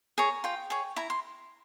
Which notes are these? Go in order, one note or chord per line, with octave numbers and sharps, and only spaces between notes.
G#4 C#5 A#5
F4 G5
G#4 C#5
E4 A#5
C6